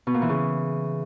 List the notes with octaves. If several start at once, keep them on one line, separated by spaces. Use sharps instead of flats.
B2
A#2
E3
C#3